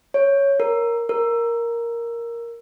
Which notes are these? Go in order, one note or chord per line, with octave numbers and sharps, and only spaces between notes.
C#5
A#4
A#4